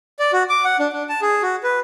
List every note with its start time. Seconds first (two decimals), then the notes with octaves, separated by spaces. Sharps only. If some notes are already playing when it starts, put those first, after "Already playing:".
0.19 D5
0.33 F#4
0.49 D6
0.65 F#5
0.79 D4
0.93 D4
1.09 A5
1.22 G#4
1.42 F#4
1.63 B4